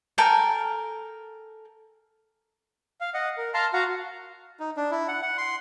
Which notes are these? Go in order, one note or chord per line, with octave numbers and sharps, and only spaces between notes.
A4 A#4 G5 G#5
F5
D#5 F#5
A#4
F5 A5 A#5 C6 F6
F#4 F5 F#5 A#5
D#4
D4
E4
F#5
F#5
C6